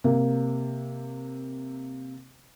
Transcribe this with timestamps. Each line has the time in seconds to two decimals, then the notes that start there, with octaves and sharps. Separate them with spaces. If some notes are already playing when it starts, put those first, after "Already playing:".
0.04 C3 A#3